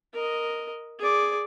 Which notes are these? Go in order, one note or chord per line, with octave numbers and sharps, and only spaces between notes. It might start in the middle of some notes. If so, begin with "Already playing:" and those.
A#4 D#5
G#4 D5